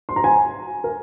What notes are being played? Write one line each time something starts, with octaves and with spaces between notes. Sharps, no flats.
C6
A#5
G#5
A#4